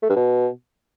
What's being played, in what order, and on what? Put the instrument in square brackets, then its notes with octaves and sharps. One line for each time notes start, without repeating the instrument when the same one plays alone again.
[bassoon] A3
G2
B2